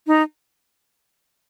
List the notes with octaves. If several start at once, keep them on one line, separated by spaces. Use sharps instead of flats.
D#4